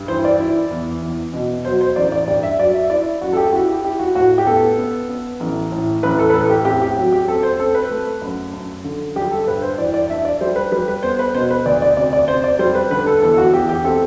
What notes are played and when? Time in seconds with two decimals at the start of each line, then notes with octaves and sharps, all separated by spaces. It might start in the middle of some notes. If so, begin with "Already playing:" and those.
Already playing: G2
0.08 E3 C5
0.25 D5
0.40 E4
0.71 E2
1.02 E2
1.34 B2
1.65 F#3 C5
1.81 C5
1.96 A1 D5
2.12 D5
2.28 G2 D5
2.43 E5
2.59 F#3 D5
2.74 E5
2.90 E4 D5
3.21 F#2 F#4
3.33 A4
3.37 G4
3.53 E4 F#4
3.69 G4
3.84 E4 G4
3.99 F#4
4.15 A2 F#4
4.38 G4
4.47 B3 A4
4.78 B3
5.09 B3
5.40 A1
5.72 A2
6.03 A1 B4
6.19 A4
6.30 B4
6.34 A2 A4
6.50 G4
6.65 C4 G4
6.82 G4
6.96 F#3
7.12 G4
7.28 C4 A4
7.43 C5
7.59 C4 A4
7.75 B4
7.91 A3
8.22 F#2
8.53 F#2
8.84 D3
9.16 G3 G4
9.31 A4
9.46 G2 B4
9.62 C5
9.78 E3 D5
9.94 D5
10.09 D4 E5
10.25 D5
10.41 G3 C5
10.56 B4
10.72 G3 B4
10.88 B4
11.03 B3 C5
11.19 B4
11.35 B2 C5
11.51 B4
11.65 D2 D5
11.82 D5
11.97 C3 D5
12.13 D5
12.28 C3 C5
12.44 D5
12.59 G3 C5
12.75 B4
12.91 D3 B4
13.06 A4
13.22 E2 A4
13.38 F#4
13.53 E2 G4
13.69 G4
13.84 C4 A4